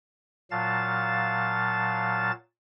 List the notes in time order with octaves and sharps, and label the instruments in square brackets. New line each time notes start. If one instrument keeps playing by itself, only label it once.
[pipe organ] A#2 F#3 F5 A5 A6